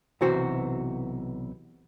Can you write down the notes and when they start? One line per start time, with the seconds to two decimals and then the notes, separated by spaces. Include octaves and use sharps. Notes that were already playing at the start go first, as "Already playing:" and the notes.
0.21 B1 C3 E3 F#4 C5